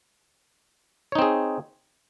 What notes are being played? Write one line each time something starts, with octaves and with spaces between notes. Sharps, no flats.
C4 D#4 G#4 C#5